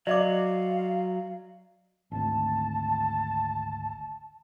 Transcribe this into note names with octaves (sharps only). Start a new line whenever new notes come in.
F#3 D5 D#5 F5 D6
G#1 D2 A5